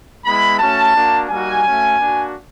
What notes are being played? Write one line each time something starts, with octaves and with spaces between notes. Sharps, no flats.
G#3 B3 E4 B5
A3 C#4 F#4 A5
A#3 D4 F#4
G3 A#3 D#4 F#4 G#5
A3 C#4 F#4
A#3 D4 F#4